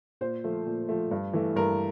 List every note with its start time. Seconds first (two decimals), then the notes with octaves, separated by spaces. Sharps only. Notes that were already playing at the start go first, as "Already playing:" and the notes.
0.21 A#2 C5
0.44 F3 A3
0.66 A#2
0.89 F3 A3
1.11 G2
1.33 E3 A3
1.56 G2 A#4